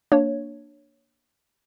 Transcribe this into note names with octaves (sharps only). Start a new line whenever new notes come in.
A#3 D4 C#5